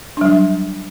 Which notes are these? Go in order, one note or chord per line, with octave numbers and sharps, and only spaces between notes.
F#3 G3 D4